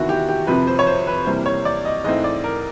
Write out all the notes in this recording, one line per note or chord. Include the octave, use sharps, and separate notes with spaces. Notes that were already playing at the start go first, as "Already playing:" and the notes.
Already playing: E2 C3 D#3 E4 F#4
G4
G4
F2 C3 F3 B4
C5
C#5
C5
B4
C3 E3 G3 A#3 C5
C#5
D5
D#5
G#2 E3 A3 C4 D#5
D5
A#4